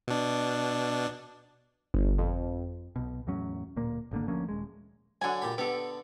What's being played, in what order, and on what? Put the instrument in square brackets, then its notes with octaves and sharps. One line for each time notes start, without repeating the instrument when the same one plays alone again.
[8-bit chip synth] B2 D4
[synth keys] G1
F2
[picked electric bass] B1 B2
E2 A2 F#3 C#4
D1 A#2 A#3
G#1 D3 A#3
D2 F3 A#3 C#4
D#1 G#3
[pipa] D3 G#5 [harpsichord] F#3 D4
[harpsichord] A#2 G4 B5
[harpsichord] D3 B3 [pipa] G4 A4